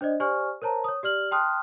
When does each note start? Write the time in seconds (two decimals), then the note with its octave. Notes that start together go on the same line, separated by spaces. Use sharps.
0.01 D4 C5 D5 D#5
0.20 G4 C5 D5 G#5 C#6 F6
0.62 A#4 C5 C#5 A5 A#5
0.84 C#5 D#6
1.03 G4 D5 F6 F#7
1.31 G5 A5 C6 D#6 F6 F#6